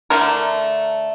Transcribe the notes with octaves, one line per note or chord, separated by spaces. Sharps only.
D3 A3 A#4